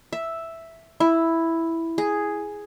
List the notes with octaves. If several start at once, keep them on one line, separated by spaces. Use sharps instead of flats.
E5
E4
G#4